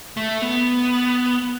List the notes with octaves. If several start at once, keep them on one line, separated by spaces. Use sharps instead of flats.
A3
B3